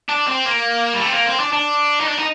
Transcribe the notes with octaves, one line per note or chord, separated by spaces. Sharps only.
D4
C4
A#3
G3
A3
C4
A#3
C4
D4
D4
D#4
D4
D#4